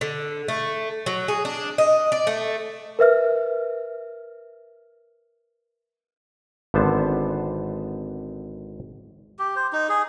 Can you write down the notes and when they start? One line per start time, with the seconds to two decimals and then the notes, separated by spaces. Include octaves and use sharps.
0.01 D3
0.48 A3
1.06 F#3
1.28 G#4
1.45 D4
1.78 D#5
2.12 D5
2.27 A3
2.99 A#4 B4 E5 F6
6.74 G#1 D3 B3 C5 A5
9.39 G4
9.56 C5
9.73 D#4
9.89 G#4